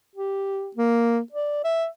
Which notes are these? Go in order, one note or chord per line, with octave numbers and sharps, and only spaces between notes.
G4
A#3
D5
E5